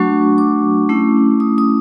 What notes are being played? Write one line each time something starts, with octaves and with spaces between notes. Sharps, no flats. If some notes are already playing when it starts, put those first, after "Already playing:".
Already playing: F#3 A3 D4 F#4 C#6
D6
A3 C#4 E4
D#6
D#6